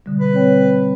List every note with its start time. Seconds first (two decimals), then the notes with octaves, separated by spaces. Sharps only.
0.06 B2 D3 G3
0.19 B4
0.33 C4 C#5 G5